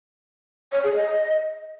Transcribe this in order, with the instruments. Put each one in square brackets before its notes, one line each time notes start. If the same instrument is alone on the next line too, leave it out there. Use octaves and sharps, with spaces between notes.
[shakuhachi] C#5
G#4
D#5